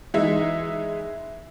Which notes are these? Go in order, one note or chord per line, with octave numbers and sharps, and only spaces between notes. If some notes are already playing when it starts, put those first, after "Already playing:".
E3 G#3 D#4 E4 E5